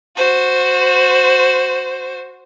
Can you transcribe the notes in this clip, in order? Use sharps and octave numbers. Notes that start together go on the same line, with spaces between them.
F#4 C5